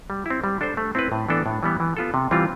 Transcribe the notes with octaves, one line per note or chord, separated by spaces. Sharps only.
G3
C4 E4
G3
D4 A4 C5
A3
C4 E4 B4
A2
E3 B3 D4 A4
A2
E3 G3 B3
E3
B3 F4 A4
C3
E3 G3 C4 F4